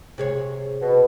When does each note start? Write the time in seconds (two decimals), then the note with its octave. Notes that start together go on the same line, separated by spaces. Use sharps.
0.18 C3 G#4 C#5
0.81 B2